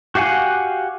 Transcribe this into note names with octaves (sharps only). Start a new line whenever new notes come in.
F#4 G4 F5 F#5 G#5